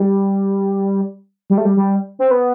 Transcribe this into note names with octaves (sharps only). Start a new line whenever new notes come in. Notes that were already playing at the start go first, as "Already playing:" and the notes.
Already playing: G3
G3
A3
G3
G3
C4
B3